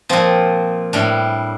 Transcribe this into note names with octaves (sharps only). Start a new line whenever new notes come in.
A#2 F3 C4
A2 G3 D4